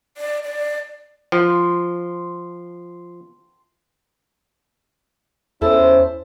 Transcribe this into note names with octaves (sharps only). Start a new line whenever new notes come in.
D5
D5
F3 C6
E2 C#4 E4 A4 C5